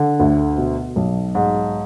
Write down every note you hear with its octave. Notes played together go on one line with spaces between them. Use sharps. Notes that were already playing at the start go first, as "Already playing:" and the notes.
Already playing: D3
D2
B2
B1
G#2